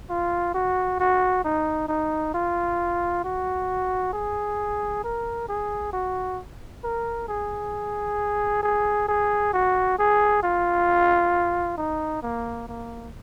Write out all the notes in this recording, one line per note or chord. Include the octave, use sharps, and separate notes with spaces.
F4
F#4
F#4
D#4
D#4
F4
F#4
G#4
A#4
G#4
F#4
A#4
G#4
G#4
G#4
F#4
G#4
F4
D#4
A#3
A#3